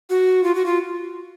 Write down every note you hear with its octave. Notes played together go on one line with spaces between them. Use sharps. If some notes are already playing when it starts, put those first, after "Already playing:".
F#4
F4
F#4
F4